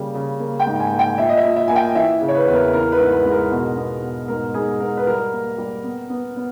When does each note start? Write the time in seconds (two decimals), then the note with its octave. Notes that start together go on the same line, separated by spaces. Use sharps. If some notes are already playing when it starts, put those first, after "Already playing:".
Already playing: C#3 G3 A#3
0.14 C#3
0.40 A#3
0.60 G5
0.67 G#2
0.80 G#5
0.92 A#3
0.99 G5
1.18 A#2 E5
1.29 D#5
1.37 E5
1.44 A#2
1.56 E5
1.68 A#3 G#5
1.76 G5
1.95 E3 E5
2.21 C#3
2.28 C#5
2.35 B4
2.47 E2 B4
2.54 A#4
2.73 E3 A#4
2.92 B4
2.99 G#2
3.12 B4
3.26 G#3
3.32 A#4
3.51 B2
3.77 B3
4.02 B2
4.28 G#2 A#4
4.54 G#2 G#4
4.80 G#2 A#4
4.97 B4
5.07 G3 A#4
5.33 A#3
5.58 G3
5.84 B3
6.10 B3
6.37 B3